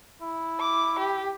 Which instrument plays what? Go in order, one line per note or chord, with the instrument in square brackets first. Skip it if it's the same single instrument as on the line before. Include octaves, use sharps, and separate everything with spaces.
[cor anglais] E4
[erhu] D6
G4